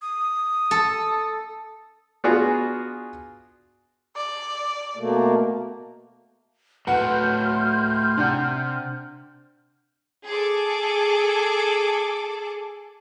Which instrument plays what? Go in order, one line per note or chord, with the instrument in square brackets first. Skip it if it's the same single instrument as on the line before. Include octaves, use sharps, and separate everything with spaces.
[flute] D#6
[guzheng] A4
[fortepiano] B3 D4 F4 F#4 G#4
[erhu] D5
[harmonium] B2 A3 A#3
[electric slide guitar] A2 F#4 [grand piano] B4 F#5 [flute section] C6 F6 G6
[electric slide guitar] C3 C4 [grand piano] D4 F#5
[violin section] G#4 A4 D6